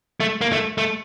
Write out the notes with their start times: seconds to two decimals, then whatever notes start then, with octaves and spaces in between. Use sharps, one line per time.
0.20 A3
0.41 A#3
0.52 A3
0.78 A3